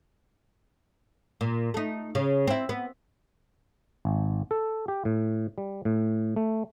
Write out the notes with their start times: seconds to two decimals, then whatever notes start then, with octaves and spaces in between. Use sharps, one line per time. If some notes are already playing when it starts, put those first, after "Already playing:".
1.41 A#2
1.74 A3 D#4
2.15 C#3
2.47 C4 E4
2.69 B3
4.05 G#1
4.51 A4
4.88 G4
5.05 A2
5.58 G3
5.85 A2
6.36 A3